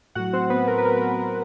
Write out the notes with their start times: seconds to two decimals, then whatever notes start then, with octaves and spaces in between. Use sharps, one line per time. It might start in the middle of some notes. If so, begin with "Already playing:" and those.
0.15 A2 F#3 F#4 F#5
0.33 C4 C5
0.50 B3 B4
0.67 A#4
0.78 B4
0.85 A#4
0.97 B4
1.01 A#4
1.19 A#4